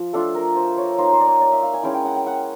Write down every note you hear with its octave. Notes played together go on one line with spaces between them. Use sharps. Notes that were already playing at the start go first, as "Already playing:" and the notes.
Already playing: F3
A3 D4 F4 A4
A#4
C5
C#5
A#3 D#4 C5
C5
D5
C#5
D5
E5
F5
G#5
G#3 C#4 E4 G5
G5
F#5
G5
F#5